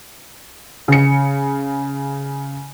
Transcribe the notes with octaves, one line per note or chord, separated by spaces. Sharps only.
C#3 C#7